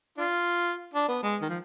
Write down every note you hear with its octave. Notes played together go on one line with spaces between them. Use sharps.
D4 F4
D4
B3
G#3
D#3
F3